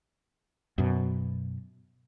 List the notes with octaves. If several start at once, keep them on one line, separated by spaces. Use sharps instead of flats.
F#2 B2